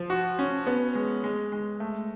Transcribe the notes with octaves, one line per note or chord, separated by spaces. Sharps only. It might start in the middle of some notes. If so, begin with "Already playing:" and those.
Already playing: F3
F#4
C#4
B3
G#3
G#3
G#3
A3